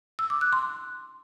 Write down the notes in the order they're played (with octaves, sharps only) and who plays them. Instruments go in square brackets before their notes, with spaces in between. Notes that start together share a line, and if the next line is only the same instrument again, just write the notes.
[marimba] E6
D6
F#6
C6